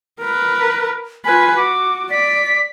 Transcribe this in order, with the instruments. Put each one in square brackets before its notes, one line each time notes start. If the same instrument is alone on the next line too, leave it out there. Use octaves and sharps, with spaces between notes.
[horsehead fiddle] A#4 B4
[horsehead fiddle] F4 B4 [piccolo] G#5
[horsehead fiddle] F#4 [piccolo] D6
[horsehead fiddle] D5 [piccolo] B6